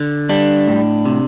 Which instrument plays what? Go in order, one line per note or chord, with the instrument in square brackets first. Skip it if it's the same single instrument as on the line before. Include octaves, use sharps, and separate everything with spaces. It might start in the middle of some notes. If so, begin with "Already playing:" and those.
Already playing: [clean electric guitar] D3
G3 D4
A2
C3